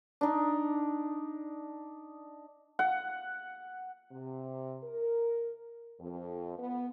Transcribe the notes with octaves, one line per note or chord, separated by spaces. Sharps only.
D4 D#4
F#5
C3
A#4
F2
B3